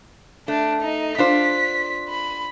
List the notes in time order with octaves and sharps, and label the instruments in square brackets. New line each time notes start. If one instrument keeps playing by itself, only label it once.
[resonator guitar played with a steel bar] A3 [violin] D4
[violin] D#4
[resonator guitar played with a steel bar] D4 F4 C5 [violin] B6
[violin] B5